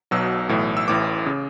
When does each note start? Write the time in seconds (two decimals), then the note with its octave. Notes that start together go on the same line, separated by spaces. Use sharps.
0.11 B1 B2 F#3 E6
0.49 B1 A2 E3
0.77 E6
0.88 A1 A2 E3 D6
1.26 C#3